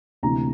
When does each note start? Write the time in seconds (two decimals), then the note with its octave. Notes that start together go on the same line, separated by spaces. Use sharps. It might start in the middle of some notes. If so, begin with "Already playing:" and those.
0.23 D2 C3 E3 A#5